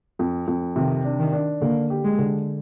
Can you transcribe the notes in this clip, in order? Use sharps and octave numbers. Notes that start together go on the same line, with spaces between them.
F2
F2
C3 D#3
D4
D#3
D4
D3 A#3
G4
G#3
D3